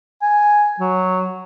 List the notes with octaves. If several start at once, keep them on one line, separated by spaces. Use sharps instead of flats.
G#5
F#3